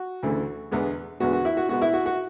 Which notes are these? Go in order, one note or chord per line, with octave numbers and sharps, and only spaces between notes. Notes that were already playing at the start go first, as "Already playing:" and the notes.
Already playing: F#4
D2 C#3 E3 A3
E2 D3 G#3 B3
E2 D3 G#3 B3 F#4
F#4
E4
F#4
B2 G#3 B3 F#4
E4
F#4
F#4